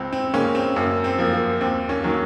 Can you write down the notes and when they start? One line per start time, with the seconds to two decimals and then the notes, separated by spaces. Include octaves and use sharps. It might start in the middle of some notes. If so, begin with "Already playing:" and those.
Already playing: C#2 C4
0.13 C4
0.34 C#3 G#3 A#3 C#4
0.55 C4
0.76 F#2 A#3
1.04 C4
1.19 F3 A#3
1.33 A#3
1.61 D#2 C4
1.89 A#3 C#4
2.03 D#3 F#3 A#3